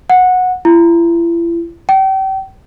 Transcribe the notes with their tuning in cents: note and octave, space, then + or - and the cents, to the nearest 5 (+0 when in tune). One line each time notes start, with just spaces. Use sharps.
F#5 -15
E4 +40
G5 -35